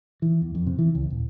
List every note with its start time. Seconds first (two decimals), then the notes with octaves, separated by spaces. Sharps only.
0.22 E3
0.41 E2
0.55 F2
0.66 C3
0.79 E3
0.95 C#2
1.10 D#1